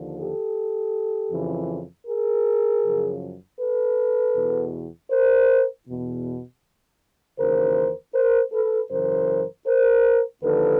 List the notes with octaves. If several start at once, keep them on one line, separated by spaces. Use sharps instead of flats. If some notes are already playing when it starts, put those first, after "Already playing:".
Already playing: D#2 D3 F3
G4 A4
F2 C#3 E3
G#4 A#4
F#2 C#3 F3
A4 B4
E2 B2
A#4 C5
E2 B2
D#2 C#3 E3 A#4 C5
A#4 C5
A4 B4
F#2 C#3 E3 A#4 C5
A#4 C5
D#2 D3 F3 A4 B4